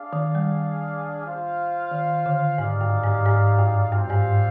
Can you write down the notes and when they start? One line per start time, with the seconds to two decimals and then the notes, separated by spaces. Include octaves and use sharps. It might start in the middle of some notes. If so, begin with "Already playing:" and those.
Already playing: D4 G#4 D5 F5
0.13 D#3
0.35 G3
1.25 F4 C5 F5
1.91 D#3
2.26 D3
2.58 G#2 D#4 G#4 D5 F5
2.81 G2
3.04 G#2
3.26 G#2
3.59 G2
3.92 G2 G3 C4 F4 C5 F5
4.10 G#2